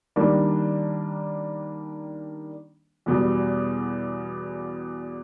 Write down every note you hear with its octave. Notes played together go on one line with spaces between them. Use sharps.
D#3 G3 A#3 D4
E2 B2 G3